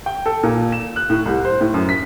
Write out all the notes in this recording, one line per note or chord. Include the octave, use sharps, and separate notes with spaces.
G5
A4
A#2
E7
F#6
A2
C2
C5
A2
F#2
B6